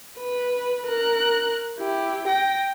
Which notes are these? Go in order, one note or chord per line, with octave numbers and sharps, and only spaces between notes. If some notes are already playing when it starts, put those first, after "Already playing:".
B4
A#4 F#6
E4 G4
G5 A#6